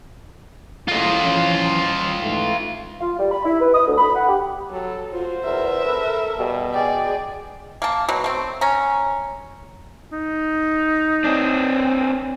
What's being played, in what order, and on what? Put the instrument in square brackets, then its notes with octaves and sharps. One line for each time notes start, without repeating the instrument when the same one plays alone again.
[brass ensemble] F#1 A2 [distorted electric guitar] F4 D#5
[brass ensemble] E3 F3 C#4
G#2 E3 A3
[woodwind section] F4
G3
B5
E4
B4
D#6
D2
B5
F#5
G4
[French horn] F#3 [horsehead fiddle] A4
[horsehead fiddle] F4 F#4 [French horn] C5
[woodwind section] E2 [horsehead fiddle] A#4 E5
[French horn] A4 [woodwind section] B4
[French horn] B2 [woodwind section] G3
[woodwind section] G#3 G5 [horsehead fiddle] G#4 D5
[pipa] A#3 A5
B2 D#3 F#3
A3 C4
C#4 A#5
[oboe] D#4
[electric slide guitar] C4 D4